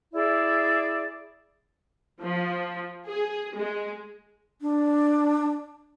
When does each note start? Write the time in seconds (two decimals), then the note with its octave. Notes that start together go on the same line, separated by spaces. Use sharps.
0.12 E4 G#4 D5
2.23 F3
3.06 G#4
3.56 G#3
4.61 D4